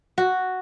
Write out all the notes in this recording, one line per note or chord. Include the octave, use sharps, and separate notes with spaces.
F#4